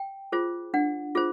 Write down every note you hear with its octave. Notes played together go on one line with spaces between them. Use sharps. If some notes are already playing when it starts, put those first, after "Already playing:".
Already playing: G5
F4 G#4 C5
D4 F#5
F4 G#4 C5